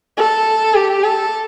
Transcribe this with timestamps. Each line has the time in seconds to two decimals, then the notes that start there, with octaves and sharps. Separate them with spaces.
0.17 A4
0.74 G4
1.03 A4